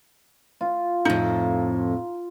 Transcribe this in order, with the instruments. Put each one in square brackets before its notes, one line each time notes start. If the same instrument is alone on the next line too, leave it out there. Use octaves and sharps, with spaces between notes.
[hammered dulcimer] F4
[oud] F2 A2 [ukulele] D#4